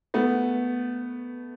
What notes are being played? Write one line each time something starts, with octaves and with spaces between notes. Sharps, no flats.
A3 B3